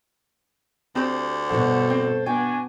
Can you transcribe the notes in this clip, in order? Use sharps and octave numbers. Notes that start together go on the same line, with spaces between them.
D2 C4 G4 C5
G2 B2 F#4 A4 C5 F#5
C4
B3 D4 F#4 G5 G#5